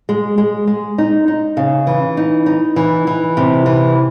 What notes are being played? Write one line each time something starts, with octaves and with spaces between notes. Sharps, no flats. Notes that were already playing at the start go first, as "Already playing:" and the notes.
G#3
G#3
G#3
D#4
D#4
C#3
E3
D#4
D#4
E3
E3
C3
E3